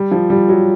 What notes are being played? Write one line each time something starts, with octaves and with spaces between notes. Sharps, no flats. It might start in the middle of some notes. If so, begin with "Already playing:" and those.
Already playing: G3
F3
G3
F#3